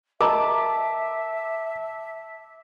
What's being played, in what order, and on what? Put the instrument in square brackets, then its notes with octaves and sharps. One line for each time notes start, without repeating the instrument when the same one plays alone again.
[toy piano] A#4 D#5 A#5 [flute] E5 [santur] A5 [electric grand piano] D6